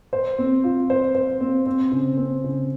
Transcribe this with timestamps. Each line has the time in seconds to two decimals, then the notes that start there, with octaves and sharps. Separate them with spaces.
0.13 C5
0.38 C4
0.64 F4
0.90 C5
1.15 C5
1.41 C4
1.66 C4
1.92 C#3
2.17 C4
2.44 C#3